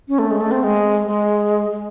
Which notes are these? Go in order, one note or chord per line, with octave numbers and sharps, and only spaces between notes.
C#4
A3
G#3
A3
C4
G#3
G#3
G#3